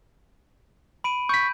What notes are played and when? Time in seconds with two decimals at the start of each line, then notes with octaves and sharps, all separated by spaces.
1.04 B5 D7 D#7
1.29 C#6 G6 B6